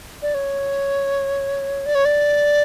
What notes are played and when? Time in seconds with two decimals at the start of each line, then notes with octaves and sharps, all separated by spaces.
0.22 D5
0.35 C#5
1.86 D5
1.95 C#5
2.05 D5